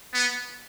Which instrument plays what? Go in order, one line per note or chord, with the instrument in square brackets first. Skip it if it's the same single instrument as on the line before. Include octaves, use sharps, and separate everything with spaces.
[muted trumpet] B3